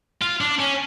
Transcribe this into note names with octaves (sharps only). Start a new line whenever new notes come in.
F4
D4
C#4